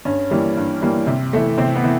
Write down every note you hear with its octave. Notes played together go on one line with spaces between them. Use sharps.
G2 C#4
E3 G3 A#3
G2
E3 G3 A#3
C3
E3 A3
C3 C4
B3
E3